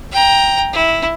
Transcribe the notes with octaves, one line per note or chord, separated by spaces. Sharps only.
G5 A#5
E4